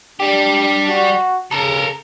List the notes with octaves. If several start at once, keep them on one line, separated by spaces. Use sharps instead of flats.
G3 D4 G4
F#4
C#3 A4 A#4